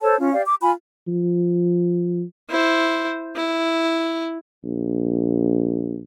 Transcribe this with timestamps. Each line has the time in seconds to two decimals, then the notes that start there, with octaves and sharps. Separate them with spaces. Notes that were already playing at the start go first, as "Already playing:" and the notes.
0.02 A4 C5 C#5 A5
0.19 C#4 F4
0.33 G4 D5 F5
0.46 D6
0.61 F4 G#5 B5
1.08 F3
2.50 E4 C5
3.36 E4
4.64 A#1